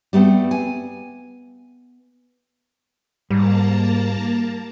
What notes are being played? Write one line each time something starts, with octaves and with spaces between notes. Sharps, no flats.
G3 A3 B3 C4
G#5
G#2 G3 A#3 A5 A#5